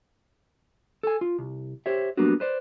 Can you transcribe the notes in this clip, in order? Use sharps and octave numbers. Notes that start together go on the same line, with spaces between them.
A4 G#5
F4
C2
G4 C5 C#5 E5
F#3 G3 A#3 B3 D4 F#4
B4 C5 D5